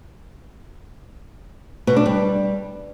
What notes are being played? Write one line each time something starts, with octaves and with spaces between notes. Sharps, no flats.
B2
D4
G3